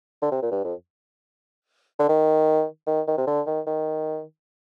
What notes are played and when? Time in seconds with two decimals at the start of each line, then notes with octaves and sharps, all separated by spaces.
0.22 D3
0.31 C3
0.42 A#2
0.51 G2
0.64 F2
1.99 D3
2.09 D#3
2.87 D#3
3.08 D#3
3.18 C3
3.27 D3
3.46 D#3
3.66 D#3